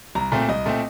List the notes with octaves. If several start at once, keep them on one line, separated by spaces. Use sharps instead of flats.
C2 A#5
A#2 A3 C4
C2 D#5
A#2 A3 C4